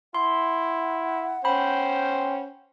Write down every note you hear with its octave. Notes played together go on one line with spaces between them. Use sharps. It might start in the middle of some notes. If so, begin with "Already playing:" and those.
E4 F#5 C6
C#4 C5 G5 B5